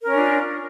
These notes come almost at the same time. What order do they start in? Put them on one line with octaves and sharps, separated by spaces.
A#4 C#4 D4 F4